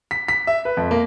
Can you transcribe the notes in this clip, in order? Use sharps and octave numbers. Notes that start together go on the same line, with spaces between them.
B6
B6
E5
B4
F2
A#3